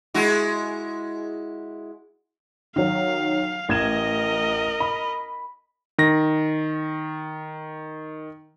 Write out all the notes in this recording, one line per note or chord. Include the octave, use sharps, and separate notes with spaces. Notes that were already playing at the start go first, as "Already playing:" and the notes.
G#3 E4 F#4
D#3 F#3 F5
A1 A#4 D#5 G#6 E7
B5
D#3 A#6